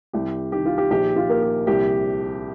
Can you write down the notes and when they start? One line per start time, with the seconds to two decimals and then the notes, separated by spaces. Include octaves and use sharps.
0.13 C2 G4
0.52 D#3 G4
0.66 F4
0.78 G4
0.91 A#1 G4
1.16 F4
1.29 A#3 A#4
1.42 G4
1.67 C2 G4